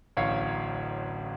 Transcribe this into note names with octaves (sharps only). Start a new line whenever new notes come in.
D1 A1 C#5 F5